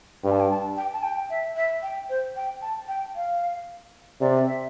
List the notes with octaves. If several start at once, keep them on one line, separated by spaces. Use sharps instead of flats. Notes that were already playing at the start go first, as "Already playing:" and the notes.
G2 G5
A5
G5
A5
G5
A5
G5
E5
E5
G5
C5
G5
A5
G5
F5
C3 D5
E5